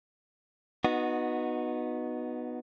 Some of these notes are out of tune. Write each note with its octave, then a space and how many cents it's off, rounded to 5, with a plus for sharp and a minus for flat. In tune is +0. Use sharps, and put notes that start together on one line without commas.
B3 +0 D#4 -5 F#4 -20